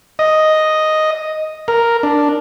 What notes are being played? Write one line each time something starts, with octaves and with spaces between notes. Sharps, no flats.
D#5
A#4
D4